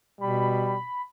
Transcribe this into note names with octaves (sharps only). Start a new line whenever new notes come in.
B2 G3 B5